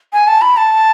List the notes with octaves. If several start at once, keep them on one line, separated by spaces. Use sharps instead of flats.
G#5
A5
B5
A5